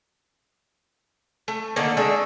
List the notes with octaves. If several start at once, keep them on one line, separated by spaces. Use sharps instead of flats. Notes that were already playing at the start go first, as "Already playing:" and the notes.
A3
D3 D#3 A3 A#3
G#3 A3 D4 E5